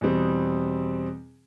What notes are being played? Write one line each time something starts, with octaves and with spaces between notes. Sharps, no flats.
E2 B2 G3 C4